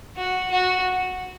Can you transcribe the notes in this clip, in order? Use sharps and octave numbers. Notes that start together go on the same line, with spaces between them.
F#4
F#4